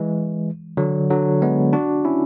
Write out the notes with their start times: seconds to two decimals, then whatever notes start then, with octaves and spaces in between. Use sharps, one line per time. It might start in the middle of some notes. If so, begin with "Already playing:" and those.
Already playing: E3 G#3
0.77 D3 F#3
1.10 D3 F#3
1.42 G#3 B3
1.73 D4 F#4
2.05 C#4 E4